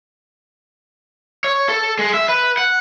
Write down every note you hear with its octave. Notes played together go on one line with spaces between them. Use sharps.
C#5
A4
G#3
E5
B4
F#5